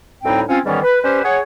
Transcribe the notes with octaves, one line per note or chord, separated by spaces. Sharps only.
D2 A2 G3 C4 D#4 G5
C4 C#4 F4
G#2 D#3 E3 G3 B3 C#4
B4
G3 C#4 G4 B4 C5
G#4 C#5 F#5